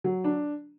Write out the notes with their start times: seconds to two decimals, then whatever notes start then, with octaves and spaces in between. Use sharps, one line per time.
0.04 F#3
0.24 D4